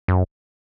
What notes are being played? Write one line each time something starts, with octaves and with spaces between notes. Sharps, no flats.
F#2